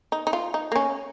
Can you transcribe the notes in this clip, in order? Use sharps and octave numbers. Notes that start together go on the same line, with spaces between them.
D#4
D#4
F4
D#4
A#3
C#4